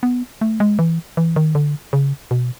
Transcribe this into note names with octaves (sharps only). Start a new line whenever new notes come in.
B3
A3
G#3
E3
E3
D#3
D3
C#3
B2